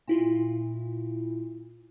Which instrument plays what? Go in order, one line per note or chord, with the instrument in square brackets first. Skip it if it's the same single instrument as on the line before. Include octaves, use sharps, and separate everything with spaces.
[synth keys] A#2 E4 F4